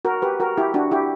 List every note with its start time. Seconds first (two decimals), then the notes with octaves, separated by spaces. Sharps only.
0.05 F#4 A#4
0.22 G4 B4
0.40 F#4 A#4
0.57 E4 G4
0.74 D4 F#4
0.91 E4 G4